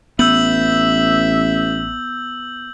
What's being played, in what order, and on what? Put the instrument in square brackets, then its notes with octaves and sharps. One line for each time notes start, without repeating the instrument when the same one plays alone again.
[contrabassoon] A1 [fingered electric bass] B3 [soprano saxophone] E5 [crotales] E6 G6 F#7